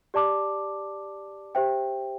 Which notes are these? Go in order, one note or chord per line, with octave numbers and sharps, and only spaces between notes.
G4 D5 A5 D6
G4 C5 E5 G5